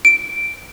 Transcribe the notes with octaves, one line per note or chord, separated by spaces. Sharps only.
D7